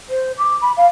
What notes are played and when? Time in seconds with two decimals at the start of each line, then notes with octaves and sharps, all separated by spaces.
0.09 C5
0.38 D6
0.62 B5
0.77 F5